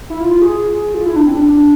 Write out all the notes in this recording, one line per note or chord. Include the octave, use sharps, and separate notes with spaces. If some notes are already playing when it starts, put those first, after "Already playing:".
E4
F4
F4
G#4
F4
E4
D4
C4
D4